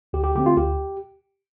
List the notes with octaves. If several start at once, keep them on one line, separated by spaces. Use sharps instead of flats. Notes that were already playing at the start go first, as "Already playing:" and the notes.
D2 G4
G4
D3 A3 C4 G4
F4
D2 G4